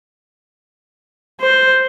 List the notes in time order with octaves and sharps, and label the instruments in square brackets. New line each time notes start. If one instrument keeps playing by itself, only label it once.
[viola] C5